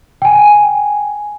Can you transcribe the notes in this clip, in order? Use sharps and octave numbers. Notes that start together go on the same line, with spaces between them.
G5 G#5